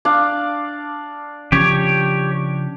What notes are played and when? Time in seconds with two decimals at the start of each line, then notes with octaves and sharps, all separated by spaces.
0.05 D4 D5 F5
1.52 C#3 F3 C#4 G4 C#5